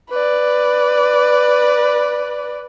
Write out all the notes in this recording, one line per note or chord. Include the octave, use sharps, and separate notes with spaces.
B4 D5